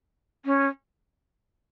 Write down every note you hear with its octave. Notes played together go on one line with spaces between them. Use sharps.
C#4